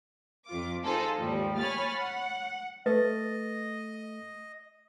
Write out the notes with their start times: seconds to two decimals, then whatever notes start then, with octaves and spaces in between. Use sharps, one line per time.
0.47 F2 F4 D6
0.83 D#4 F4 G#4 A4 C5
1.18 D#2 G#2 F3 G3
1.58 C#5 G#5 B5 F6 A6
1.95 F#5
2.86 A3 B4 D#5 A6